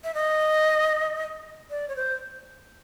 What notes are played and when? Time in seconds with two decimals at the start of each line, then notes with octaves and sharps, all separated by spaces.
0.04 E5
0.14 D#5
1.70 D5
1.88 C#5
1.96 C5